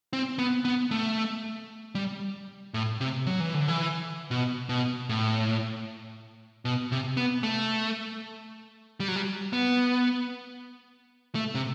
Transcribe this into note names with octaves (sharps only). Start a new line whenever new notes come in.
C4
B3
B3
A3
G3
A2
C3
F#3
E3
D3
E3
B2
B2
A2
B2
C3
B3
A3
G3
F#3
G3
B3
A3
C3